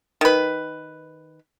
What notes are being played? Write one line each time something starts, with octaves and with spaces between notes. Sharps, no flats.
D#3 B4